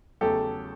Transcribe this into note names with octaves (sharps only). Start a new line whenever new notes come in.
E2 C#3 F#3 A3 G4 A4